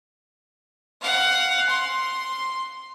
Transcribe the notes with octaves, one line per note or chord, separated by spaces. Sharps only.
F5 F#5
C6